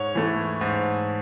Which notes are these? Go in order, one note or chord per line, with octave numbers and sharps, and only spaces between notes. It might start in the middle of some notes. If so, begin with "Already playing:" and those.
Already playing: G#2 C#5
E3 A3
G#2